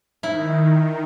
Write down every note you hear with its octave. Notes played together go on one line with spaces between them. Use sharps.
D#3 E4